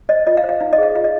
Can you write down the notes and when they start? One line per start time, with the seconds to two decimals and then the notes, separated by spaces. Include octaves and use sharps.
0.09 C5 D#5
0.27 F4 D#5
0.37 F5
0.44 C5
0.49 F5
0.61 D#4 F5
0.73 D#5
0.78 G#4 C5 F5
0.95 F4 F5
1.04 D#5